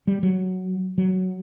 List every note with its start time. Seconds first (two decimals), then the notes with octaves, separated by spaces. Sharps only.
0.07 G3
0.23 F#3
0.98 F#3